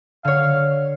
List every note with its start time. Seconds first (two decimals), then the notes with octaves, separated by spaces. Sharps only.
0.24 D3 C#5 F5